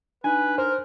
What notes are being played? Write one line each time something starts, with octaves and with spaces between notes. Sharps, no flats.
D4 D#4 B4 G#5
A#4 C5